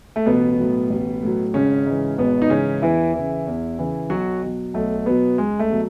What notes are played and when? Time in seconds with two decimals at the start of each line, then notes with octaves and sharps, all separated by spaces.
0.16 A3
0.26 A1 B2 B3
0.59 A2 F#3
0.90 A1
1.23 A2 F#3
1.54 G#1 C#3 C#4
1.87 G#2 E3
2.18 G#1 B2 B3
2.42 D#4
2.50 G#2 C#3 E3 C#4
2.82 E2 E3 E4
3.14 C#3 E3
3.47 E2
3.78 C#3 E3
4.10 B1 F#3 F#4
4.42 B2 F#3
4.74 B1 A3
5.06 B2 F#3 B3
5.38 C#2 G#3
5.59 A3
5.70 B2 F#3